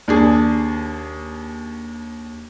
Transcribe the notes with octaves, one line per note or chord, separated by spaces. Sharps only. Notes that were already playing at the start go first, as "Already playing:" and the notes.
D#2 D4 G#4